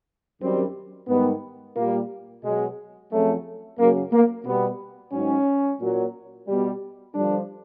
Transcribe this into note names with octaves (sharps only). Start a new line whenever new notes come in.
F#2 D#3 G3 C4
G#2 D#3 G3 B3
A#2 G3 A#3
B2 F#3 G#3
F2 C#3 F#3 A3
F#2 C#3 F#3 A#3
A#3
B2 G3 B3
G#2 D#3 F#3 C#4
A#2 F#3
B2 G3
G2 D3 F3 D4